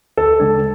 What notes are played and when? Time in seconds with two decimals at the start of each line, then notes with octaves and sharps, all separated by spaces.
0.17 D2 A4
0.40 C#3 G#3 D4